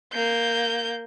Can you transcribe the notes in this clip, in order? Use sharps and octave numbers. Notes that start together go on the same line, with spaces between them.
A#3 G6